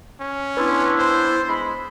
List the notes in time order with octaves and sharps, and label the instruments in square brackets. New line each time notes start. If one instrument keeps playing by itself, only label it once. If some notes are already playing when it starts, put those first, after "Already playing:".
[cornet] C#4
[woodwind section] B3 D4 E4 [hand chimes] B4 C6
[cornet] C5 [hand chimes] C6
[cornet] G#3 [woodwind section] B5